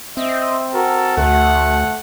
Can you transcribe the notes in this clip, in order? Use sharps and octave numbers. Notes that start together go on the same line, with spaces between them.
C4 D#5 E5
F#4 A4 A#4
D2 A3 F#5